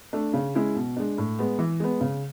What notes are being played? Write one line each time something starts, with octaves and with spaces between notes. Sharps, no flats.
A3 D4
C#3
G#3 C#4 E4
B2
G#3 D4
A2
G#3 B3
E3
G#3 B3
C#3